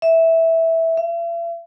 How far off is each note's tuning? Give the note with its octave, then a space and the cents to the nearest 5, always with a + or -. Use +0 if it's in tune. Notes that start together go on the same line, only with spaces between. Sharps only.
E5 -10
E5 +45